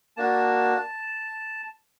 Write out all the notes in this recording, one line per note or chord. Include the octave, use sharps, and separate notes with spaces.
A#3 D4 F#4 A5